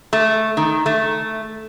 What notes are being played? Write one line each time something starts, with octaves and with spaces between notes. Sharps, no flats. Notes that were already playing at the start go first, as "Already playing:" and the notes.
A3
D#3
A3